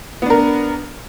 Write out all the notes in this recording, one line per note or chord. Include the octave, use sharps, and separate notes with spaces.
B3 D4 A#4